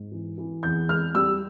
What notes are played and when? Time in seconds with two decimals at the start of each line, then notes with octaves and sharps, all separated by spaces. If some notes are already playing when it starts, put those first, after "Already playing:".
Already playing: G#2
0.12 E3
0.38 E3
0.63 E2 G6
0.88 G#3 F6
1.15 G3 E6